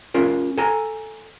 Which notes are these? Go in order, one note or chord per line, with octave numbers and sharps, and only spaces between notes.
C#4 F4 A#4
A4 G#5 A#5